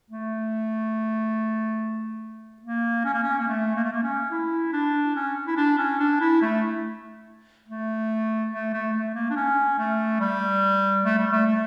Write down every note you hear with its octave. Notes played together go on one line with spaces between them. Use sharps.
A3
A#3
C#4
A#3
C#4
A#3
A3
A#3
A3
A#3
C#4
E4
D4
C#4
E4
D4
C#4
D4
E4
A3
A3
A3
A3
A3
A#3
D4
C#4
A3
G3
A3
G3
A3
A3